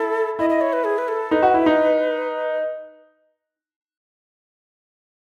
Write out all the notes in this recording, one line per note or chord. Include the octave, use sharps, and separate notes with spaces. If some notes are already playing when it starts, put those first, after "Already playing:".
Already playing: E4 A4
E4 D#5
D#5
C#5
B4
G#4
B4
A4
D#4 B4
F#4
E4
D#4